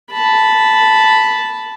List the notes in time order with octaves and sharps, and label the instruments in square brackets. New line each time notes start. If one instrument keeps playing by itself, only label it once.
[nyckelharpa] A5 B5